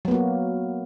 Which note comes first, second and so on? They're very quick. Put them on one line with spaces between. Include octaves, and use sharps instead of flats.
F#3 B3 A#3 F#4